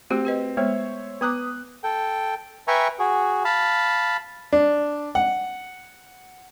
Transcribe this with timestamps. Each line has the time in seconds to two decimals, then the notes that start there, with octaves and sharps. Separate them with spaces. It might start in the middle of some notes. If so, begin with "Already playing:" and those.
0.11 A3 C4 F#4 G4
0.25 G4 B4 D#5
0.57 G#3 B3 C5 C#5 E5
1.21 B3 B4 A#5 D6 D#6 F#6
1.84 A4 G5
2.68 B4 E5 G5 G#5 A#5 C#6
2.99 F#4 G#4
3.45 F5 A5 B5
4.53 D4
5.15 F#5